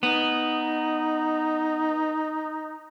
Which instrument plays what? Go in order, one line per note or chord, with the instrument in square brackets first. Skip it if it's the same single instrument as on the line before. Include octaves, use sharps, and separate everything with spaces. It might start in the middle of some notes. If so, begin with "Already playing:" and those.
[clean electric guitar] B3 [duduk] D#4